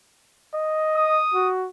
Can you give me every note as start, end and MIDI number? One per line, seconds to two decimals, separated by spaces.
0.54 1.21 75
0.96 1.49 87
1.34 1.68 66